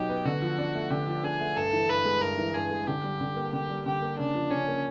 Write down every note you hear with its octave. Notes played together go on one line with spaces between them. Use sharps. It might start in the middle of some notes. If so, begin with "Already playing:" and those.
Already playing: B2 F#3 D#4 G4
B3
D3 F#4
F3
D4
A3
D3 G4
F3
D4 G#4
A3
G2 A4
E3
G2 B4
G#3
G2 A#4
E3
G2 G#4
G#3
D3 G4
G3
D3
A#3
D3 G4
G3
D3 G4
A#3
C#3 D4
F3
C#3 C#4
A#3